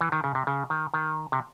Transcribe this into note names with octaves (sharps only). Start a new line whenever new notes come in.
E3
D#3
C#3
C3
C#3
D#3
D#3
C3